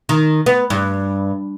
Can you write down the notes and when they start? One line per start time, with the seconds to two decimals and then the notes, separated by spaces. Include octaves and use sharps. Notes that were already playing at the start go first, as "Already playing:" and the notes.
0.09 D#3
0.46 B3
0.70 G2